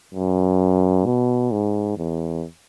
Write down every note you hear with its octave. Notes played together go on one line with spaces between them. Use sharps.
F#2
B2
G#2
E2